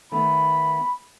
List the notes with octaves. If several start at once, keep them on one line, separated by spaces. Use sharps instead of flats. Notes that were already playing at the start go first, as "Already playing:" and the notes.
D#3 A3 B3 B5